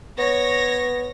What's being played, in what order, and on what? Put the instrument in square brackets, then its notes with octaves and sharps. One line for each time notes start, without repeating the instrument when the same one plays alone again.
[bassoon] B3 [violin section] C#5 A#6